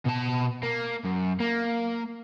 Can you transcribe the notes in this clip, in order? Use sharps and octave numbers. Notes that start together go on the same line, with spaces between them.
B2 A5
A#3
F#2
A#3